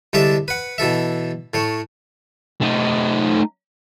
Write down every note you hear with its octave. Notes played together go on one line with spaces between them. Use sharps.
C2 D3 G#3 D5 E5 A5
B4 F#5
B2 E3 A4 E5
A2 A3 C#5
A3 D#4